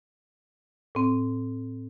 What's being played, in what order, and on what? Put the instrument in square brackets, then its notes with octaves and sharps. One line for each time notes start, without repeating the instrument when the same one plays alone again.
[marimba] A2 C4